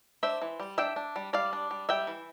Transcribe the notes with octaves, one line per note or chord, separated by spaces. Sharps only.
D4 C5 E5
E3
G3
D4 E5 G5
D4
G3
G3 D5 F5
D4
G3
G3 E5 G5
E3